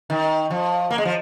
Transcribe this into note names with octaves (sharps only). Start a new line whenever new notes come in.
D#3
F3
A#3
G#3
F3